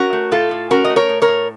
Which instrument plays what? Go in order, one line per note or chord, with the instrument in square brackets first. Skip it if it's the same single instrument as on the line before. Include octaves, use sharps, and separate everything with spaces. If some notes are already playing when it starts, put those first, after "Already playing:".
Already playing: [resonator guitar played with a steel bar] C#4 F#4 A#4
A3
A2 F4 A4
A2
C#4 F#4 A#4
D#5
A3
A#4 C#5
A2
A#4 C#5
A2